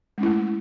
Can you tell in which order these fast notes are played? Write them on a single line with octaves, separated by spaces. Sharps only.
G#3 C#4 E4 A3